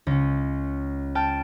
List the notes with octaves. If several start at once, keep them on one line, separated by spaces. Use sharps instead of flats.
C#2 C#4
G5 A5 F6